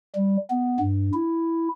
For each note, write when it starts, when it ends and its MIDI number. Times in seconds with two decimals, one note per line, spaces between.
0.15 0.37 55
0.50 0.78 59
0.80 1.10 43
1.14 1.68 64